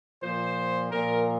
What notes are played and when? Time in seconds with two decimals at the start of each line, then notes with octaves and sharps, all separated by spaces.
0.22 A#2 F3 C5
0.91 A#2 F3 A#4